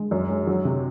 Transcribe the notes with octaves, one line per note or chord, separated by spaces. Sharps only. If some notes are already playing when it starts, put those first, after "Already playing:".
Already playing: G#3
F#2
G#3
F#3
C3